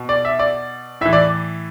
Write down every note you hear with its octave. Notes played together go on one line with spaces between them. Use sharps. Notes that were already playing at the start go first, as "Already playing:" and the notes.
Already playing: B2
D5
E5
D5
A2 E3 E5
D5